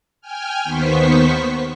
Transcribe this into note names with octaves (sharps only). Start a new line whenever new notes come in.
G5 G#5 F6
D#2 D#3 B3 C5 C#6 B6